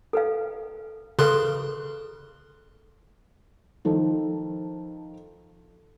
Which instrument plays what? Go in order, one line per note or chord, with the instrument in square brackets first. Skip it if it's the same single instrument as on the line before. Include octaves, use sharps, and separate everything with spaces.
[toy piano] A4 B4 F5
[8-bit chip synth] C#3 C6 F#6 [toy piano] G#4 A4 B4
[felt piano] D#3 F3 A4